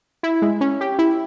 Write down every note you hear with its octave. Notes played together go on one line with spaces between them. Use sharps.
E4
G#3
C#4
G4
E4